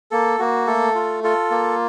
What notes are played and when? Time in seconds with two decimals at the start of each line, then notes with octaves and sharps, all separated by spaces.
0.11 A#3 A4
0.39 A#3 F#4
0.67 A3 A4
0.95 F4
1.24 F4 A4
1.51 A#3